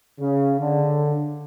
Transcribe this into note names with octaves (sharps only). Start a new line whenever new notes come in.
C#3
D3